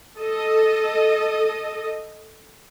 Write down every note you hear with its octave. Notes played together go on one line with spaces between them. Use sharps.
A4 D#5